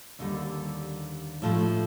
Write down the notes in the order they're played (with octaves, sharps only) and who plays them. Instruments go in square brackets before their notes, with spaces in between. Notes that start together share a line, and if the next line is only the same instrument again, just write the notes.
[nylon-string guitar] D#2 D3 G3
A2 F3 A3